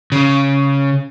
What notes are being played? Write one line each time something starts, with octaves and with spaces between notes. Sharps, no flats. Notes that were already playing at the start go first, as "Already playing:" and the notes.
C#3